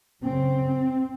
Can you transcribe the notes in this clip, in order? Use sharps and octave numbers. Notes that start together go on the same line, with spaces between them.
F#2 C#3 C4